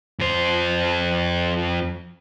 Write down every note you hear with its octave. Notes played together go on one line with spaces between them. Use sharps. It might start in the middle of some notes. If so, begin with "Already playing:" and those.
F2 C5